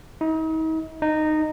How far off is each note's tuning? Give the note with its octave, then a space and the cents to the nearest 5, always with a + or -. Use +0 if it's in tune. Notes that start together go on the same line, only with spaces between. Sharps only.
D#4 +40
D#4 -15